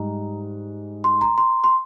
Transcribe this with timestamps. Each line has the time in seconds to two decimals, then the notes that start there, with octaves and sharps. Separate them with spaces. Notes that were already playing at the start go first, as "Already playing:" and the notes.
Already playing: G#2 G3 A#5
1.04 C6
1.21 A#5
1.38 C6
1.64 C6